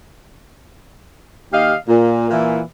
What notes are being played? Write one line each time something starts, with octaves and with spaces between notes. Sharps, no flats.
D#2 G4 D#5 F5
A#2
A#2 E3